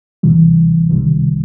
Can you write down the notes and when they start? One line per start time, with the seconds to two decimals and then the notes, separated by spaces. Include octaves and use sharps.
0.23 D2 C3 E3 G3
0.90 C2 C3 D#3 G3